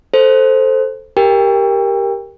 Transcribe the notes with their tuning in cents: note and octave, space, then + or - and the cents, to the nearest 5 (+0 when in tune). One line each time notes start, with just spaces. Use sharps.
A4 +0 C5 +0
G4 +0 A#4 +0 G5 +30